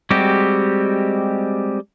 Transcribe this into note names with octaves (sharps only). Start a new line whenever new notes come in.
G3 G#3 C4 F#4 G4